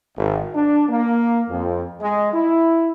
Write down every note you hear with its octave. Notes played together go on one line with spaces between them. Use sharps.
G#1
D4
A#3
F2
G#3
E4